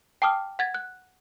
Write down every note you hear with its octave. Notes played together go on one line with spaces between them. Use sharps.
G5 A5 D6 D#6 F6
F#5 G#6 A6
F#6